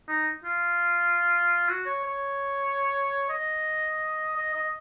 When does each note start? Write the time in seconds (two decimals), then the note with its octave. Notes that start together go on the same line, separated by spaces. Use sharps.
0.08 D#4
0.44 F4
1.68 F#4
1.86 C#5
2.04 C#5
3.29 D#5
4.36 D#5
4.54 D#5